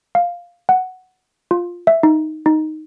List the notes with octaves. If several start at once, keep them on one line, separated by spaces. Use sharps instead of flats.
F5
F#5
F4
E5
D#4
D#4